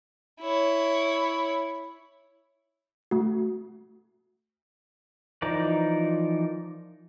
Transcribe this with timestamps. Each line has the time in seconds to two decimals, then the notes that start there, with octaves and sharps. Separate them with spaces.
0.41 E4 C#5
3.11 A3 F#4
5.42 E3 F3 D#4 A#4 D5